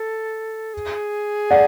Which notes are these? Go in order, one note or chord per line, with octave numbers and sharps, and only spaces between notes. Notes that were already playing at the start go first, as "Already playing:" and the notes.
Already playing: A4
G#4
D5 F#5